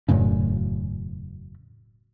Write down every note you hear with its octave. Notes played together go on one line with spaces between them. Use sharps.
E1 F#2 A2 C#3